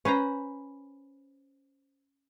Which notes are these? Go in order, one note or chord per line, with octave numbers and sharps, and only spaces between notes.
C#4 B4 C5 A#5